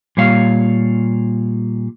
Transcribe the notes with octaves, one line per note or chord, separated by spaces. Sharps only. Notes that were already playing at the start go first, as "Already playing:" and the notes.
A#2 G3 C#5 F5